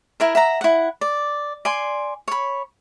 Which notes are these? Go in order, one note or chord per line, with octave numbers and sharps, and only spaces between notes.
E4 A#4 E5
E5 F#5 A#5
E4 F#5
D5
D5 G#5 C6
C#5 B5